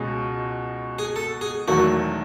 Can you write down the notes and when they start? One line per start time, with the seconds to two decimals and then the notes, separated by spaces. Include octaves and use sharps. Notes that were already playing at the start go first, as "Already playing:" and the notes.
Already playing: C#2 B2 G#3 C#4
0.99 G#4
1.16 A4
1.41 G#4
1.68 E1 E2 D#3 F#3 A3 F#4